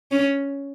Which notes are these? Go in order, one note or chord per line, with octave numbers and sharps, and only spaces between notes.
C#4